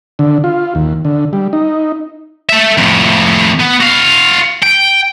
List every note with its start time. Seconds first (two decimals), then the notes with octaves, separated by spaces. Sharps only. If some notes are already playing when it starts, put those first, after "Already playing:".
0.19 D3
0.44 F4
0.75 D#2
1.05 D3
1.33 G3
1.53 D#4
2.49 A3 E5
2.78 F2 A2
3.60 B3
3.81 F#4 F5
4.63 G5